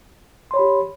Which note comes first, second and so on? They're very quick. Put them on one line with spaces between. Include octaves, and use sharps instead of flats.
C6 C#5 B5 G4